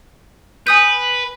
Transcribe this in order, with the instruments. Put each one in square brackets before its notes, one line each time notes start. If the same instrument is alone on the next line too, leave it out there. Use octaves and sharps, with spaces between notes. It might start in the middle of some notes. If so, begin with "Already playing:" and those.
[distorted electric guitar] B4 [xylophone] G#5 D#6 G6